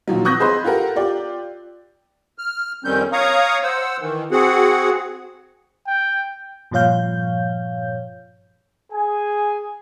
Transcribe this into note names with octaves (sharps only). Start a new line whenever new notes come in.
A#2 D#3 F3 F#3
C#6 D#6 E6 F#6 G6 A#6
G#4 C5 D#5 B5 C6
F4 G4 A4 A#4 F#5
F4 G4 D5
F6
F2 D#3 G3 C4 C#4 G6
C#5 F5 A#5 C#6 D#6
C5 F#5 E6
D#3 E3
C4 F#4 G#4 F#5
G5
G2 A#2 F3 C#5 F5 G6
G#4 G#5